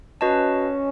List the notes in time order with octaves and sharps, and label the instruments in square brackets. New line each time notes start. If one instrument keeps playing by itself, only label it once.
[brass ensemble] C#4 [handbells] F#4 B4 D#5 A5